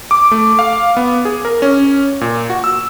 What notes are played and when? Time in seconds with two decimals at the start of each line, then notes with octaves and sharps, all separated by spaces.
0.11 D6
0.31 A3
0.59 F5
0.97 B3
1.25 G#4
1.45 A#4
1.62 C#4
2.21 A#2
2.50 F#4
2.64 E6